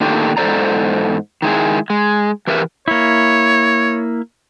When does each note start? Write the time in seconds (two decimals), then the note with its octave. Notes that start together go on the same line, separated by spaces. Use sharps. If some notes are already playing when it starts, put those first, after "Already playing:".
0.01 A#2 D3 D#3 A3 D4 G4
0.37 E2 G#2 A4 C5 D5 A#5
1.42 D#3 G#3 E4 G#4
1.90 G#3
2.47 E3 G4 A#4 B4 E5
2.88 A#3 E4 C#5